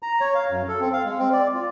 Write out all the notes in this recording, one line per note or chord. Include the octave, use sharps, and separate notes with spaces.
A#5
C#5
F5
F#2
A4
C4
F5
G#3
C4
D5
F4